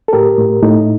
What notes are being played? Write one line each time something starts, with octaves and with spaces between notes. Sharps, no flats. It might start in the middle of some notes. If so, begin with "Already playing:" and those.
A4
A2 G4 A#4
A2
A2 D#4